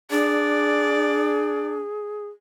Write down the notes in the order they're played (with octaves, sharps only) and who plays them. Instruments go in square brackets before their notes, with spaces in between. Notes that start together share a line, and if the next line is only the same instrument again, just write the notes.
[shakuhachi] D4 [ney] G#4 [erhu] D5